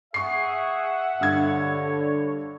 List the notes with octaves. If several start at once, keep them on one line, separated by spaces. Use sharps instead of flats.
G#4 E5 F#5 C#6 C7
G2 D3 C#5 E6 G#6